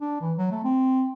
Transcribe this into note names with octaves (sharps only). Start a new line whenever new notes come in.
D4
E3
F#3
A3
C4